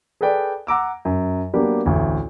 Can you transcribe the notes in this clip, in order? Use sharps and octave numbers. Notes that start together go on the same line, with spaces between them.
G#4 A4 B4 D5 G5
F#5 A#5 D6 E6
F#2
F#3 A#3 B3 D4 G4
A1 D2